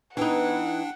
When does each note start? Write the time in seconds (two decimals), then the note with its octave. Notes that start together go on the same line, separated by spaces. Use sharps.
0.17 E3 B3 D4 D#4 B4 F#5 G5